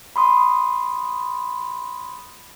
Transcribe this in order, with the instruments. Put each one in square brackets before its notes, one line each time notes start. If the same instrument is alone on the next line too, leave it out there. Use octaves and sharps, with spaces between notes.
[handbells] B5 C6 D#6